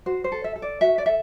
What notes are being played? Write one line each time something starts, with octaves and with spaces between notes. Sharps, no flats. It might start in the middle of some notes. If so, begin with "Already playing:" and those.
F#4 C5
C5
A4
E5
A4
D5
F#4 E5
D5
A4 E5